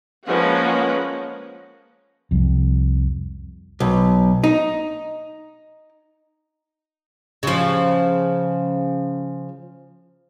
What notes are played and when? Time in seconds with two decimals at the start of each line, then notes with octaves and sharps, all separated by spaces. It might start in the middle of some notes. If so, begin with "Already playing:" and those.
0.25 F3 G#3 A#3 C#4 B4 F#5
2.31 C2 F2
3.80 B1
4.44 D#4
7.43 C#3 F3